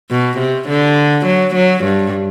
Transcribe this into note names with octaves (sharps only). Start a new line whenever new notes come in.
B2
C3
D3
F#3
F#3
G2